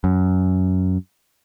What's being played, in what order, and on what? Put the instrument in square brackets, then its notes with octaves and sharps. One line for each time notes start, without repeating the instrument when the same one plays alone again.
[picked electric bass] F#2